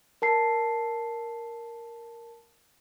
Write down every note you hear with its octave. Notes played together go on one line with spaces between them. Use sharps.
A#4 A5 C7